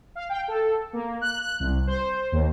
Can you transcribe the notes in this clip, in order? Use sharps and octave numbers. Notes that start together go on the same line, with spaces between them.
F5
G5
A4
A#3
F#6
F#6
C2
C5
D#2